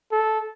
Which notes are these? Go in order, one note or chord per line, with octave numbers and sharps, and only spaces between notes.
A4